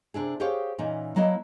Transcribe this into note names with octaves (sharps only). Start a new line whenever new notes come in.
C3 D4 E4 G#4
G4 G#4 C5 C#5 F5 F#5
A#2 E3 C#4 D#4
F#3 A#3 E4 D#5 A5